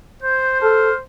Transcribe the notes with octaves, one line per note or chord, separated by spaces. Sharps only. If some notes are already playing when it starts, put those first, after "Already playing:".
C5 G6
A4 F6